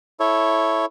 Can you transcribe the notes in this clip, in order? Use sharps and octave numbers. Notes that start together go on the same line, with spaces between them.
E4 A4 C#5